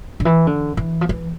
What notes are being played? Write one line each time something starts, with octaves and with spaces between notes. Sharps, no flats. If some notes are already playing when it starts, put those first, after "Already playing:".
D3
E3
D3
E3
F3
E3